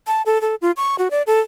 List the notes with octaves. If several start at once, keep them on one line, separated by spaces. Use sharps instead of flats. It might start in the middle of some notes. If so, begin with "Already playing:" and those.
A5
A4
A4
F4
C#6
F#4
D5
A4